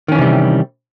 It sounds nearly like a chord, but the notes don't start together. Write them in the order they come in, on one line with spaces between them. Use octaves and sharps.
D#3 C#4 E3 C3 G3